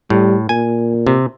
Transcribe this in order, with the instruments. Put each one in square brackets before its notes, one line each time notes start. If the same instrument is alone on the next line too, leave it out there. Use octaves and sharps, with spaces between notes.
[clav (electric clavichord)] A2 [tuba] G3
[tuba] A#2 [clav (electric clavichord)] G#5
[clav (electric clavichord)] C3